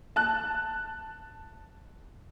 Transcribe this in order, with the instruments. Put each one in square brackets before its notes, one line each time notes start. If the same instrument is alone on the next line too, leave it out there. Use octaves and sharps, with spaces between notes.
[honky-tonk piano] A5 F#6